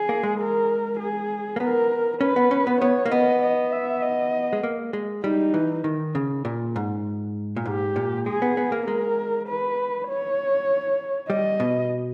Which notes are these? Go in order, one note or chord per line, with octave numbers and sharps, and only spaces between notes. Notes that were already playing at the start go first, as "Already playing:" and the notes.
Already playing: G#4
A#3
G#3
A#4
G#4
A#3
B3 A#4
C#4 B4
B3
C#4
B3
B3 C#5
A#3
B3 D#5
D#5
E5
D#5
G#3
A#3
G#3
G3 D#4
E3
D#3
C#3
A#2
G#2
A#2
G#2 G4
A#2
G#3 G#4
B3
B3
A#3
G#3 A#4
B4
C#5
G3 D#5
B2